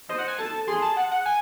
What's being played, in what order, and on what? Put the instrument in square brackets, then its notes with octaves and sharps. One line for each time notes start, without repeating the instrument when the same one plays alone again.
[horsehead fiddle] C5 [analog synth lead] D#5
[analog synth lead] F#5
G#5
[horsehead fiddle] A4 [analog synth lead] A5
[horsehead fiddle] G#4 [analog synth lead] C6
[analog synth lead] A5
F#5
F#5
G#5